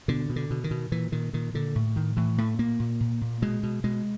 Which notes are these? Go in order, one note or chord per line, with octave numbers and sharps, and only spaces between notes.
B2 D3
B2
D3
B2
D#3
B2
A#2 E3
A#2 D#3
A#2 D#3
A#2 D3
A2
A2 D#3
A2 E3
A2 A3
A#2 A#3
A#2
A#2
A#2
B2 G#3
B2
B2 G#3